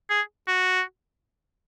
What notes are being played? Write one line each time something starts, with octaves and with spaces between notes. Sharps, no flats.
G#4
F#4